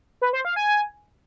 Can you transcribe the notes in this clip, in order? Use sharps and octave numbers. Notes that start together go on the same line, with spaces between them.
B4
C5
F5
G#5